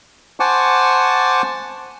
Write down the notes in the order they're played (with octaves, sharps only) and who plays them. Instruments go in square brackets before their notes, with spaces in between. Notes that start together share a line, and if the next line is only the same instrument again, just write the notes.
[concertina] C5 F#5 G#5 A5 C#6 D6